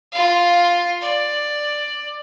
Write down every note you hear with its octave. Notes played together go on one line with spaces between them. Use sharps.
F4 F5
D5